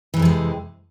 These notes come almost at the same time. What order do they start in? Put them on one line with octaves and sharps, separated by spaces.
E3 G#2 F2 C3 G#3